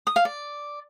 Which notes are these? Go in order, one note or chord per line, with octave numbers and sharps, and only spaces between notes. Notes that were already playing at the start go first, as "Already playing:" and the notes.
D#6
F5
D5